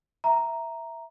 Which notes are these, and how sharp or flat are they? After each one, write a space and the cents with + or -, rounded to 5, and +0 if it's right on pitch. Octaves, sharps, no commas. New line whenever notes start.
E5 +0 A#5 +0